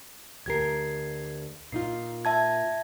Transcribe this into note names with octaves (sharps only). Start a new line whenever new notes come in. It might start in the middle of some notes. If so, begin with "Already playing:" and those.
D2 G4 A#4 G#6 C7
A#2 D#4 F4 C7
E5 A5 G#6